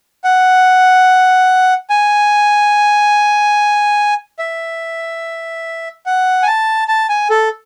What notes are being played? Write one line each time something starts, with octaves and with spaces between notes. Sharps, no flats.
F#5
G#5
E5
F#5
G#5
A5
A5
G#5
A4